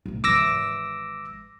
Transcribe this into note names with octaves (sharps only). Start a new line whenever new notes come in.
B1 A2
G#1 E3 D6 E6 A#6